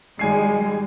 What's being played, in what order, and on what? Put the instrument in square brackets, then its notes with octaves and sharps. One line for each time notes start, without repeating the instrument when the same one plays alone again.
[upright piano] G#1 G#5 C7 [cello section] G3 G#3